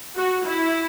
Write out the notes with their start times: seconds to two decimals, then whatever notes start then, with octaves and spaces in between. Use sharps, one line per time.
0.15 F#4
0.46 E4